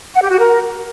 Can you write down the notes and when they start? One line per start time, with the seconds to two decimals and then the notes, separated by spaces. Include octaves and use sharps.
0.14 F#5
0.22 G4
0.30 F#4
0.38 A#4